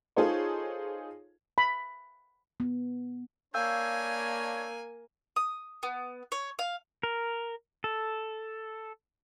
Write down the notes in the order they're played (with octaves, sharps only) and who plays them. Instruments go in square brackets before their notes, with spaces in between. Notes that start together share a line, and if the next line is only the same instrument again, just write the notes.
[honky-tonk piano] D#4 F4 G#4 A4 C5 C#5
[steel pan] B5
[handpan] B3
[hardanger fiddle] A#3 G#5 [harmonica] D4 C#5 [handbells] F5 E6 G6
[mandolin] D#6
B3
C#5
F5
[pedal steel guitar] A#4
A4